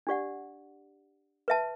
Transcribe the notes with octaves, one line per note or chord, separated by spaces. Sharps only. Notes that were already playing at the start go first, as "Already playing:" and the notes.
D4 G4 D5 F#5
B4 E5 A5